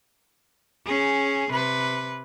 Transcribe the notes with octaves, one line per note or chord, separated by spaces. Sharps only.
C#4 G#4
C3 B4